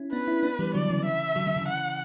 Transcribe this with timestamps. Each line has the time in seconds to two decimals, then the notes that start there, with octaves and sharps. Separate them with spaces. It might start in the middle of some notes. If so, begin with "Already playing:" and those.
Already playing: C#4 E4
0.12 B3 D4 B4
0.27 C#4 E4
0.43 B3 D4
0.59 E3 G3
0.74 D3 F#3 D5
0.90 C#3 E3
1.05 E5
1.36 D3 F#3
1.46 D3 F#3
1.56 C#3 E3
1.68 F#5